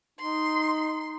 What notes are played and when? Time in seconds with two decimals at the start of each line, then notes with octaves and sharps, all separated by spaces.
0.19 D#4 C6